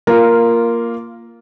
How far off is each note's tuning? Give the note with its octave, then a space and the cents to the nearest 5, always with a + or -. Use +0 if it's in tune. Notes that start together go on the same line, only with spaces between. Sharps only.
A#3 +0 F4 -10 A#4 +0